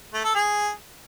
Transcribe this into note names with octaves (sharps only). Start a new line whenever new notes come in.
A3
A4
G#4